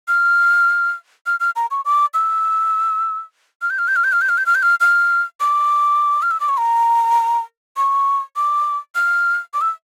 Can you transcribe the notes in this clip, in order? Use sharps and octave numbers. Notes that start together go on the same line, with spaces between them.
F6
F6
F6
A#5
C#6
D6
E6
F6
G6
F6
G6
F6
G6
F6
G6
F6
G6
F6
G6
F6
F6
D6
F6
E6
D6
C#6
A#5
C#6
D6
F6
D6
E6